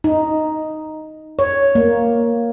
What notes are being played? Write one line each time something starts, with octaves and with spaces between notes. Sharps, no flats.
D#4
C#5
A#3